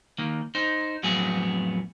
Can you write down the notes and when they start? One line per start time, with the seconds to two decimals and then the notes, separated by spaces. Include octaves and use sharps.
0.18 D#3 A#3
0.55 D#4 C5
1.03 F2 A2 F#3 B3 G#4